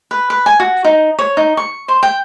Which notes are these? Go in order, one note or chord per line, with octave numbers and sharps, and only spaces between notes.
B4
B4
G#5
F#4
D#4
C#5
D#4
C#6
C5
G5